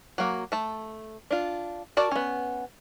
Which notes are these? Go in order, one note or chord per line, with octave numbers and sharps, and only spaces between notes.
F#3 A#3
A3 A5
D4 F4
F#4 A#4 D5 A5
B3 C#4